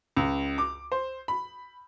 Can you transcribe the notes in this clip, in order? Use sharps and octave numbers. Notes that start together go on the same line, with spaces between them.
C#2
D6
C5
B5